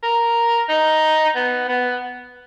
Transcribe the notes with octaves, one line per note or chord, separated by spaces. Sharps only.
A#4
D#4
B3
B3